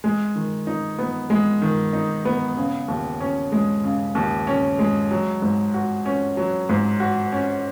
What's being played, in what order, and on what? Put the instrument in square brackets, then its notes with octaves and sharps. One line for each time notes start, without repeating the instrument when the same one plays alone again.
[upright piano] G#3
D#3
D#4
B3
G#3
D#3
D#4
B3
C#3
D#2
C#4
G#3
C#3
D#2
C#4
G#3
F#3
G#2
F#4
C#4
F#3
G#2
F#4
C#4